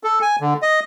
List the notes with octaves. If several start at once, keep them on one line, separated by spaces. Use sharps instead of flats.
A4
G#5
D3
D#5